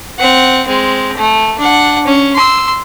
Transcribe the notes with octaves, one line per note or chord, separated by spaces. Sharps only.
C4 F#5
G#3 C4
A3
D4 F#5
C#4
C6 E6